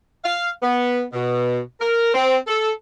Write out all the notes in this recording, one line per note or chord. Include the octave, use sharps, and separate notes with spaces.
F5
B3
B2
A#4
C4
A4